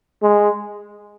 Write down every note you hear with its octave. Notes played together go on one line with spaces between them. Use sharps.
G#3